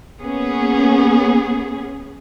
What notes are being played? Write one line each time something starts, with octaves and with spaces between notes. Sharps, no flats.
A#3 B3 C#4 G#4